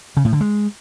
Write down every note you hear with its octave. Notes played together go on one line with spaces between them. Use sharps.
C#3
A2
D3
G#3